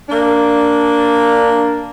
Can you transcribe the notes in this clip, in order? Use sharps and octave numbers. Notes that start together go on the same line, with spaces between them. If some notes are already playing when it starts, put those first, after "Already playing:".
A#3 D4